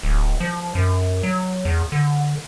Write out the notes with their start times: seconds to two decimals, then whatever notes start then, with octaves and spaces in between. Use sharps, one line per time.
0.03 D1
0.40 F3
0.75 F#2
1.23 F#3
1.65 E2
1.92 D3